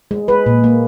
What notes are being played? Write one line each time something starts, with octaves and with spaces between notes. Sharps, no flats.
G#3
G#3 B4
A#2
A#3